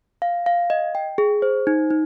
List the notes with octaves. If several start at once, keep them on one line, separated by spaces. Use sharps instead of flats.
F5
F5
D#5
G5
G#4
C5
D#4
D#4